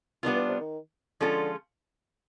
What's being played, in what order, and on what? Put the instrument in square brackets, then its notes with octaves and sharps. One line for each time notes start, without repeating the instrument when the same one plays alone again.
[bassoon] D#3 [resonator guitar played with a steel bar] G3 B3 D4 F4
[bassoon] E3
C3
D#3
[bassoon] D3 [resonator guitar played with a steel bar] F3 G#3 C#4 F4 A4